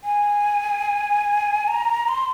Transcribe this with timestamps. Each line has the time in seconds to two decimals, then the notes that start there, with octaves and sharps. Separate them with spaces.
0.04 G#5
1.68 A#5
2.08 C6